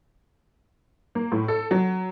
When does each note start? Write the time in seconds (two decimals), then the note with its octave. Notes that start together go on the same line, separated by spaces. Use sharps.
1.15 A#3
1.32 A2
1.48 A4
1.71 F#3